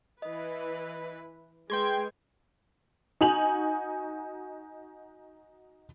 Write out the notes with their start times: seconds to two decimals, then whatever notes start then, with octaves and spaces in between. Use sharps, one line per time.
0.22 E3 B4 D#5
1.70 G#3 G#4 B4 G5 C6 G#6
3.21 D#4 F#4 G#5 F7 F#7